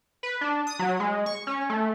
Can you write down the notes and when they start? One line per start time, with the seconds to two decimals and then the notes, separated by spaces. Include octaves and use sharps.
0.23 B4
0.41 D4
0.67 D#6
0.79 F#3
1.00 G#3
1.26 C#6
1.47 C#4
1.70 A3